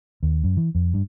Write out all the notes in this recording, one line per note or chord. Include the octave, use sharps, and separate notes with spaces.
D#2
F#2
E3
F2
G2